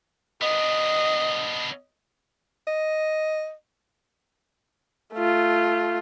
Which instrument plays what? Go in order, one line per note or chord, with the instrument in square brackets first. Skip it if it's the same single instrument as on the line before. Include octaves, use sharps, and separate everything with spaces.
[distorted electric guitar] B3 D4 [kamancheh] D#5
[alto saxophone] D#5
[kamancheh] A3 F4